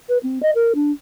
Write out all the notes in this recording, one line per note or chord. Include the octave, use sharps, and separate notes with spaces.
B4
C4
D#5
A#4
D4